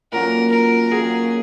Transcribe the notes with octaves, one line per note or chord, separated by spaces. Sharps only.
A#2 F#3 C#4 F#4 A#4
A#4
C#3 F#3 A#3 C#4 G#4